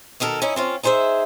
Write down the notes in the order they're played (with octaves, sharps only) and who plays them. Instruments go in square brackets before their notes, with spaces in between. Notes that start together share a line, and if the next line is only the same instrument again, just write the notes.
[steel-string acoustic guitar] B2 D#3 A4 A#4
C#4 D#4 E4
C4 C#4 F4
D#4 G#4 C5 C#5 E5